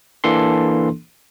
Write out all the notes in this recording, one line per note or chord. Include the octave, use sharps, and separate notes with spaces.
E3 A#3 D4 A4 C6